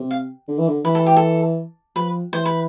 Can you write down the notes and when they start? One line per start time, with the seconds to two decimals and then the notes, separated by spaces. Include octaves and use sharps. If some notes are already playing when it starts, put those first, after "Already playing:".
Already playing: C3
0.11 F5
0.48 D3
0.58 E3
0.68 D3
0.85 E3 B4
0.95 A4
1.06 G4
1.17 A4
1.96 F3 B4
2.33 E3 C5
2.45 B4